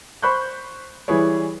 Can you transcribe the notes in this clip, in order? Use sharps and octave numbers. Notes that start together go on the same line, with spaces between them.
C5 B5 C#6 F#6 G6
E3 G3 E4 G#4 B4 C#5